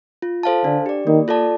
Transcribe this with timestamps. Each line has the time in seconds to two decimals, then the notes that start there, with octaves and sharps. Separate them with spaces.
0.22 F4
0.43 A4 C5 F5 A5
0.64 D3 D4
0.86 G4 D5
1.07 D#3 A#3
1.28 F4 A4 D5 A5